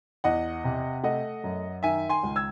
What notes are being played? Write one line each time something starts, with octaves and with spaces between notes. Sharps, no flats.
E2 D#5 F#5
C3
A3 D#5 F#5
F#2
D#3 E5 G#5
G#5 C6
C#2
E6 G#6